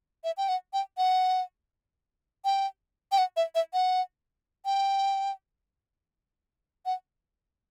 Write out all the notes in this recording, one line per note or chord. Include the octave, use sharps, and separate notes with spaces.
E5
G5
F#5
G5
F#5
G5
G5
F#5
E5
E5
F#5
G5
F#5